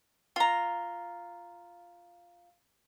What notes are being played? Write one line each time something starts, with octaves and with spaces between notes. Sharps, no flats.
F4 A#5